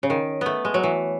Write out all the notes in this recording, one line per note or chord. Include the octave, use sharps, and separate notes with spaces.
C#3
D#3
A3 B3
G#3
F#3
E3